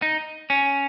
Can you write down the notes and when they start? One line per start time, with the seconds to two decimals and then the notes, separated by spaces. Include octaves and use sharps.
0.02 D#4
0.50 C#4